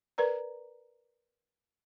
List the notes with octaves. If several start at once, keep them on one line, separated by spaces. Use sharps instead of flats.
A#4 B4 D5 A#5